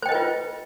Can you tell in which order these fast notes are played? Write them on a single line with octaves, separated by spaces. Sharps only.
C5 G5 D#5 B4 F4